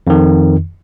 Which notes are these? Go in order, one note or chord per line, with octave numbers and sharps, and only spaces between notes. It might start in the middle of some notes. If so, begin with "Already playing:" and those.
F2 D#3